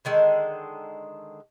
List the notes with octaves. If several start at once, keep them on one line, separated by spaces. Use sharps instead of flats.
D3 D#3 G#3 A4